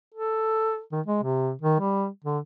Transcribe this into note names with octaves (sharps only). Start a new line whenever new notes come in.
A4
D#3
G#3
C3
D#3
G3
D3